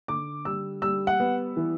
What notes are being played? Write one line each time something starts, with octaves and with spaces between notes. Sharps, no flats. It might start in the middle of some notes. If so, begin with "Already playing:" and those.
D3 D6
G3 E6
G3 E6
F#5
B3
E3